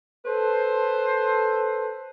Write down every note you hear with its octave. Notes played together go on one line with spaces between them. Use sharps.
A4 B4 C5